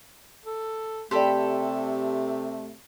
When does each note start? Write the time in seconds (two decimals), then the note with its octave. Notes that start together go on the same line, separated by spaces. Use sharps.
0.45 A4
1.11 C3 A3 G4 A4 D5 B5 C6